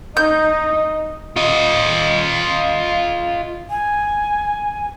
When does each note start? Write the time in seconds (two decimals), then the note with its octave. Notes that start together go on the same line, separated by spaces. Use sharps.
0.17 D#4 D#5 G6
1.36 F4 D#5
3.70 G#5